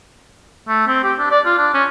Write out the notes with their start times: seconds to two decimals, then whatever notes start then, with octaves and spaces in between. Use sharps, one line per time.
0.68 A3
0.88 C4
1.04 G4
1.19 D4
1.31 D5
1.46 F4
1.58 D4
1.74 C#4